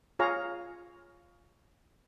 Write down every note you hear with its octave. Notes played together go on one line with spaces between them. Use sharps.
F4 G#4 C#5 F5 A#5